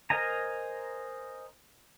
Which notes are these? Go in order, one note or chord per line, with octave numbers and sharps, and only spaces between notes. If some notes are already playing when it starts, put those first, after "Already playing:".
A#4 C5 D#5 G#5 A#5